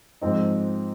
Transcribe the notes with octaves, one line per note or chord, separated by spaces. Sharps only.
G#2 F3 C4 D#4